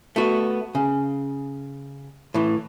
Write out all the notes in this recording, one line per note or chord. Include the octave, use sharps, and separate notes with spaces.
A3 B3 F#4
C#3
A2 E3